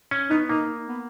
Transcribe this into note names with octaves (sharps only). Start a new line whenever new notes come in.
C#4
B3 D#4
A#3 D#4
B3